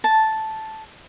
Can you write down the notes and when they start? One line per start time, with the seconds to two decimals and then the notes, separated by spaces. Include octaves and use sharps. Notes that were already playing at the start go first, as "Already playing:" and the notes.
0.04 A5